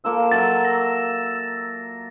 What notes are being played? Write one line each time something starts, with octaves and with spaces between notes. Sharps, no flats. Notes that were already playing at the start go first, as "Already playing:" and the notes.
F3 A#3 A4 E6
F#3 A#4 E5 A6
A#6